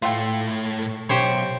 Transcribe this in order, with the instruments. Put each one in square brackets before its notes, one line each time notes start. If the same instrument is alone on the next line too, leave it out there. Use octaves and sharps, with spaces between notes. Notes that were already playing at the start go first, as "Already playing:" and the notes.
[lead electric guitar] A2 A3 [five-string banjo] F4 A4 G5
[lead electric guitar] B1 [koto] G4 C5 C#5